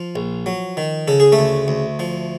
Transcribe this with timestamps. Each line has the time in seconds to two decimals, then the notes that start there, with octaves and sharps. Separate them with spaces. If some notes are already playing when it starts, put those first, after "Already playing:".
Already playing: F3 F4
0.16 A#1
0.46 F#3
0.77 D#3
1.08 C#3 A4
1.20 G#4
1.32 A3 A4
1.39 D2
1.68 D2
1.99 F3